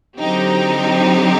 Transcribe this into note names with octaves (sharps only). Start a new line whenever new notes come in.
D3 F#3 C4 D#4 G4